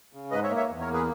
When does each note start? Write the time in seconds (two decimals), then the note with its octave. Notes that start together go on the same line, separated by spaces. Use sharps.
0.13 C#3
0.31 G#2 B4 D#5
0.44 C#5 E5
0.50 A#3
0.56 C#5 E5
0.69 E2
0.81 A#4 C#5
0.87 A#3
0.93 G#4 B4